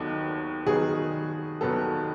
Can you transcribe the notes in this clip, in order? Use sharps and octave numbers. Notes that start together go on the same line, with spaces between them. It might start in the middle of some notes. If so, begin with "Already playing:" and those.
Already playing: D#2 D#3 F#3 B3 A4
D#2 D#3 F#3 B3 G#4
D#2 D#3 F#3 B3 A4